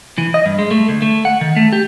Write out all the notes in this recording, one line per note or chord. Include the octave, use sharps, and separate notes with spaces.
E3
D#5
G2
G#3
A3
D2
A3
F#5
D#3
A3
G4